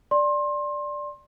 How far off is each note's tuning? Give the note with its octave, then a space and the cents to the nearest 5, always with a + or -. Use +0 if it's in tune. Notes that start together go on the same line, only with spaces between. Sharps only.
D5 +0 C6 +25